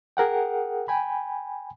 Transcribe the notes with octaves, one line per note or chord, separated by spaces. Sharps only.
G#4 A#4 F#5 G5
G5 G#5 B5